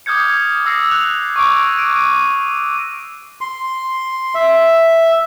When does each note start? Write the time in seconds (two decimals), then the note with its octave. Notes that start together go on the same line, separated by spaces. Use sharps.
0.06 D6 D#6 F6 G6 G#6 C#7
0.65 D#6 E6 A#6 C7 C#7
0.90 F#6 F7
1.36 C#6 D6 D7
1.77 D7 D#7
3.41 C6
4.35 E5